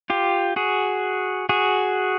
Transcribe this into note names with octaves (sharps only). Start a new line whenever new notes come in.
F4 G4
F#4 G#4
F#4 G#4